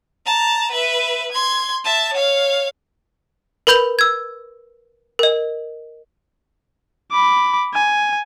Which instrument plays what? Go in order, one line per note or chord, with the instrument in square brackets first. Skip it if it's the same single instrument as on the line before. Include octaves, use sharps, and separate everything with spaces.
[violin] A5 A#5
B4 E5
C6 G#6
E5 A5
C#5 F5
[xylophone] A#4 B4 B5 G6 F7 F#7
E6 G#6
A#4 D#5
[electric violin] B5 D6
G#5